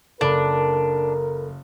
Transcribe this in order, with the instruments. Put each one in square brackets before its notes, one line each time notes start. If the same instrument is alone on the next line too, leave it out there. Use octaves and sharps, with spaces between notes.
[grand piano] F#1 [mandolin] D4 [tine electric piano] A4 B5 [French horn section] A#4